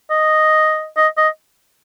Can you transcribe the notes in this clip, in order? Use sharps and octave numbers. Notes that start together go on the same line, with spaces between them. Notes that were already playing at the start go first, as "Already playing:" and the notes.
D#5
D#5
D#5